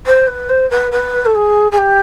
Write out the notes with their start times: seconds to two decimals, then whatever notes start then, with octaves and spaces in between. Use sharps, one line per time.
0.06 C5
0.27 B4
0.49 C5
0.70 B4
0.92 B4
1.25 A4
1.35 G#4
1.72 G#4
1.78 G4